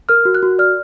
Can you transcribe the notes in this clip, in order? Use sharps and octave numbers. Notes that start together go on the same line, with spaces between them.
A#4 F6
F#4
F#6
F#4
D5 F6